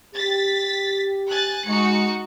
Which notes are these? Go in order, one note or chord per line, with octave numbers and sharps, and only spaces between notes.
G4 A6 B6
G#5 F#6 A6
G#3 D#4 F#4 C#7